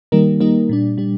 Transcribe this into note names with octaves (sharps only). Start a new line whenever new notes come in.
D#3 G3 A#3 D#4 A#4
D#3 G3 A#3 D#4 A#4
A#2 G3 D4
A#2 G3 D4